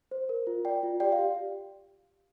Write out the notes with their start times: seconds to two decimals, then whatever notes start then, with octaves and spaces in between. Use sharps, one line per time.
0.11 C5
0.29 A#4
0.47 F4
0.65 D5 G5
0.83 F4
1.00 G4 D5 G5
1.12 F5
1.19 G4